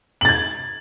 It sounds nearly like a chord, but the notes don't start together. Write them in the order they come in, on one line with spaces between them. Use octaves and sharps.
F#7 A6 G#6